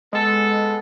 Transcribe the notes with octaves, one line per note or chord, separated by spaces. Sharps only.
G#3 B3 A4